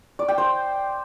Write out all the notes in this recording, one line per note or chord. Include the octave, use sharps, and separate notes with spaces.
D5
G5
C5